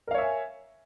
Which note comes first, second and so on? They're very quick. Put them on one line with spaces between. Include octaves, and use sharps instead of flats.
A#4 F5 C#5 E5 G#5